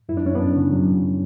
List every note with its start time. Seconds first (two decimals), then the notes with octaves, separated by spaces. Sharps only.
0.09 F#2 E4
0.17 D4
0.25 F#2 C#4
0.35 F#2 B3 D4
0.55 C#3
0.71 F#2 F#3
0.87 F#2